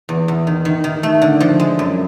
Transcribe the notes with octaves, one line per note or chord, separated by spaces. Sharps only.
E2
E2
D#3
D#3
D#3
A3
D3
F3
G#3
F#2